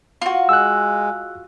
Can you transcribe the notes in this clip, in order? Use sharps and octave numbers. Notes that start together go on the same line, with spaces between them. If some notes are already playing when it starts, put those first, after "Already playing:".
F4 F#4
G#3 E6 F#6